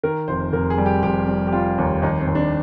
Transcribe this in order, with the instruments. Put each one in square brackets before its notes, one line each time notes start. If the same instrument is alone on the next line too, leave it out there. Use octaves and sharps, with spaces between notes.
[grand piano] D#3 A#4
F1 C5
F1 A#4
G#4
G3
G4
F1 G4
G3
G4
G3 F4
D#2
D#2 D#4
C4
D#2
D4